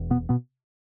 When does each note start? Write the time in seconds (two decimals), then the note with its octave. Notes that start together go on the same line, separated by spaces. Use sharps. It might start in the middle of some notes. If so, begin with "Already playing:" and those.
Already playing: E1 E2
0.11 B2 B3
0.29 B2 B3